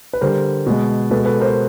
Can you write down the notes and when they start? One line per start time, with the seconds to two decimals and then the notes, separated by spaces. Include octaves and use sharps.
0.13 B4
0.21 D3 G3 A#4 C5
0.67 B2 G#3
1.11 B2 G#3 A4 B4
1.26 A4 B4
1.40 A#4 C5